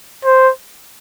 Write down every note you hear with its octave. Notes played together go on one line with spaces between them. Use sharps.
C5